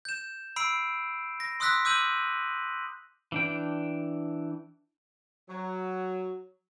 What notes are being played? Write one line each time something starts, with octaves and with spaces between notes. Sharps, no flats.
G6 E7
B5 E6 C7 D7
A#6
C6 D#6 E6 F#6 A#6 B6
D6 E6 G6 D#7 F#7
E3 D4 G5
F#3